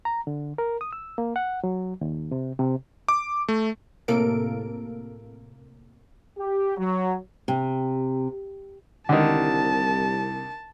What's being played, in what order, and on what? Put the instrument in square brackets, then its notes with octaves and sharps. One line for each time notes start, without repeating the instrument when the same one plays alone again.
[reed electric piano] A#5
D3
A#4
D#6
E6
A#3
F#5
F#3
D#2
C3
C3
[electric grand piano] D6
A3
[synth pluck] A2 C3 A#3 A4 A#4 D7
[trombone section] G4
F#3
[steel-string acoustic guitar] C3
[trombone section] C2 [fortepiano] D3 D#3 [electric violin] A5